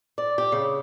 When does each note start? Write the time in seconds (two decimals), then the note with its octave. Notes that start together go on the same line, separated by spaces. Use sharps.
0.18 D5
0.38 G4
0.52 C#3